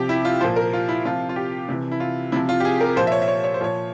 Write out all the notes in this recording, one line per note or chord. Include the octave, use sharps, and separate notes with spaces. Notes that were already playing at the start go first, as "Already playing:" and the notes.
Already playing: C3 F3 G4
E4
F4
A#2 F3 C5
A#4
F4
E4
C3 F3 F4
F4
G4
C3 E3
E4
F4
C3 F3 E4
F4
G4
G#4
A#4
A#2 F3 C5
E5
C#5
E5
C#5
C#5
C5
A#2 F3 C#5